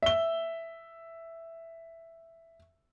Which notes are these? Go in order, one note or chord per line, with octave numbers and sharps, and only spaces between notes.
E5 G7